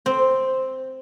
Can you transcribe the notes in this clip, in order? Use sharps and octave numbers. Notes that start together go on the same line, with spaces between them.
C4